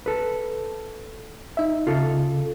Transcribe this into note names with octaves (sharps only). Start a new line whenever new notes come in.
A4 B4
D#4 E5
C#3 F4 A4